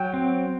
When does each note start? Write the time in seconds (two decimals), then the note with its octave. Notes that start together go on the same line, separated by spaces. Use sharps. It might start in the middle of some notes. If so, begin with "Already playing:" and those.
Already playing: F#3 G5
0.14 C4